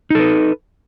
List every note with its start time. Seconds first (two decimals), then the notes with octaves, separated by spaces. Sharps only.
0.10 D#4
0.15 A4
0.19 B4